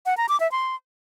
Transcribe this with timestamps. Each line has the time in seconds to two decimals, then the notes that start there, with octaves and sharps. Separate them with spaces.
0.06 F#5
0.17 A#5
0.29 D6
0.40 E5
0.52 C6